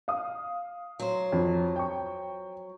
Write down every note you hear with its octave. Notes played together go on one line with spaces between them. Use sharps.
F5 D#6
F#3 C5
F2
G5 C#6